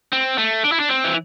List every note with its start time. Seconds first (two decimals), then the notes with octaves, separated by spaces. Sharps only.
0.13 C4
0.38 A3
0.64 D4
0.72 E4
0.80 D4
0.89 C4
1.04 E3